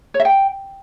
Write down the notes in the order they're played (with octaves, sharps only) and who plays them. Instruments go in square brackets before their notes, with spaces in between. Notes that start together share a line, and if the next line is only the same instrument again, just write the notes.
[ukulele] C#5
E5
G5